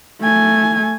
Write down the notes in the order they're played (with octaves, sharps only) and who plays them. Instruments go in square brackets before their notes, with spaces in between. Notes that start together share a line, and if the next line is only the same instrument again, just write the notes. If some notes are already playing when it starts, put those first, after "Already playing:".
[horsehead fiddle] A3 G#5